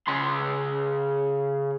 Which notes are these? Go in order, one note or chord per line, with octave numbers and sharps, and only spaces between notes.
C#3 C6